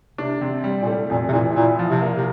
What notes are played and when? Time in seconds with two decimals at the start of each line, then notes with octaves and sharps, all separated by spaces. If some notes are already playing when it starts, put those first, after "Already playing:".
0.18 C3 D4
0.41 C3
0.64 G3
0.82 A#2
0.87 A2 A3
1.10 F2 A#2
1.28 C3
1.33 A#2 E3
1.56 A#2 E4
1.79 F3
1.90 C3
2.02 A#3
2.17 C3